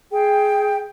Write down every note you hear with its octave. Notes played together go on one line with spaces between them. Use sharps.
G#4 G5